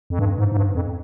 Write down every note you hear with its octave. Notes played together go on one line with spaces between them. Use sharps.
F2
G2
G#2
G#2
G2
F2